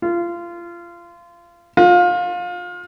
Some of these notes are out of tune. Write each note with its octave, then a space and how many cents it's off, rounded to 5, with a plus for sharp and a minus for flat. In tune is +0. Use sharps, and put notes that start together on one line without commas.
F4 -25
F4 +25